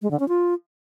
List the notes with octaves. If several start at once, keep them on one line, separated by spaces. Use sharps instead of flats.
G#3
D3
C#4
F4